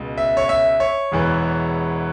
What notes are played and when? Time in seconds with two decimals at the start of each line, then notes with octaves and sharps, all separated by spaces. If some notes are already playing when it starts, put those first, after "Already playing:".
Already playing: C#2 B2
0.18 E5
0.37 C#5
0.49 E5
0.80 C#5
1.12 E1 E2 E3